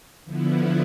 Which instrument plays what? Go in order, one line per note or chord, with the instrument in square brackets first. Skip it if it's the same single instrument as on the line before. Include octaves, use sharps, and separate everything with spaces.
[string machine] D3 F3 B3 E4